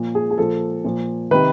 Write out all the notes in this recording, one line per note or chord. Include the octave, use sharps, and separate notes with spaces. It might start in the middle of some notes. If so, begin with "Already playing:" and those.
Already playing: A#2 F3
G#4
G#4
A#2 F3 A4
A#2 F3
C3 D#3 B4